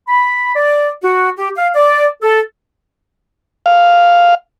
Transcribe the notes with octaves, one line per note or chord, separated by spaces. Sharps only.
B5
D5
F#4
G4
F5
D5
A4
F5